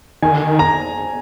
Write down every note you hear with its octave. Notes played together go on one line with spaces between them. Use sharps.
D#3 G#5
D3
D#3
A#5